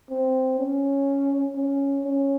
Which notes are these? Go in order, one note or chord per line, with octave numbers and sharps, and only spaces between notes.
C4
C#4
C#4
C#4